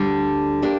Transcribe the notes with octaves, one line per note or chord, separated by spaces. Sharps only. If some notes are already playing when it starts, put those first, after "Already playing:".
Already playing: D2 D3 G3 D4
A#3 D4 G4